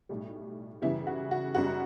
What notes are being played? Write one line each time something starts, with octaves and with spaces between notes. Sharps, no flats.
B1 A2 G3
F#2 C#3 E3 G3 E4
F#4
F#4
F#1 F#2 C#3 G3 F#4